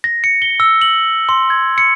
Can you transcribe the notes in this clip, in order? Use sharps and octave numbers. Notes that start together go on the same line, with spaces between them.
A#6
C#7
G7
E6
F#7
C6
G#6
C#7